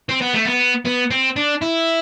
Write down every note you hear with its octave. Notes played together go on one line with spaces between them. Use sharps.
C4
B3
A3
B3
B3
C4
D4
E4